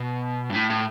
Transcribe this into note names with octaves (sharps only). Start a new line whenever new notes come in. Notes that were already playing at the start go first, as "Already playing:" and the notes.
Already playing: B2
G2
A2
A2